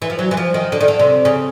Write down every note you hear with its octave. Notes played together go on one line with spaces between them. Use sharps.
E3
F3
F#3
E3
F3
D#3
D3
D#3
D3
C3
C#3